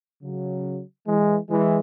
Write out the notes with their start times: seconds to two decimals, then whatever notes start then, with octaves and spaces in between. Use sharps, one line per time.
0.22 C#3 F#3
1.08 E3 G#3
1.50 E3 G#3